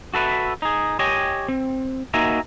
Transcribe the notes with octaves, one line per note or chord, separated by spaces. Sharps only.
F#4 A4 B4 E5
D#4 G#4
G4 C#5 D#5 G5 G#5
C4
A#3 D#4 F#4 E5 G#5 A#5